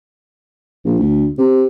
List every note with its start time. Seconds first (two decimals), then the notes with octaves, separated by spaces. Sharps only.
0.85 A#1
0.99 D2
1.38 C3